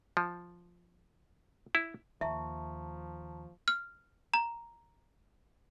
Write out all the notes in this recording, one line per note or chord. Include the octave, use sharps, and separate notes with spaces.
F3
E4
D#2 F3 E5 A5 A#5 C#6
F6
A#5